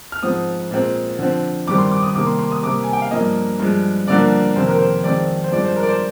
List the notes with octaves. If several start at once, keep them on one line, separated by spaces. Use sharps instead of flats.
F6
G#2 F3 C4 D#6
A#2 G#3 C4
D3 F3 C4
G2 D#3 G3 C4 D6
C6
D6
D#6
C3 D#3 G3 A#3 D6
C6
C6
D#6
C3 G3 A#3 D6
G#5
G5
F5
G2 F3 A#3 D#5
G2 F3 G#3
G2 D3 F3 A#3 D5
F2 C3 D#3 A#3 C5
A#4
C5
F2 D#3 G#3 C4 D5
C5
G2 F3 G#3 C4 D5
C5
A#4
D5
C5